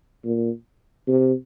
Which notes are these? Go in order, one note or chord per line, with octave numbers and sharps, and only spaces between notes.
A#2
C3